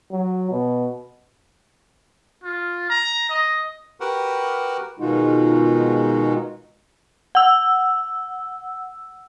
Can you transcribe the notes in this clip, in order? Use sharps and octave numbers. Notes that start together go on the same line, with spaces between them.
F#3
B2
F4
A#5
D#5
F#4 G4 A#4 B4 F#5
B2 D#3 G#3 D#4 F4 F#4
F#5 E6